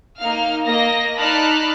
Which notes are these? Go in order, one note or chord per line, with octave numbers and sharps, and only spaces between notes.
A#3 D#4 F5 F6
A#3 D#5 A#6
D#4 D5 A5 B5 F6 F#6